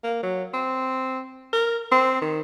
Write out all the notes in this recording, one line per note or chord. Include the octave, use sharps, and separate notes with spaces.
A#3
F#3
C4
A#4
C4
D#3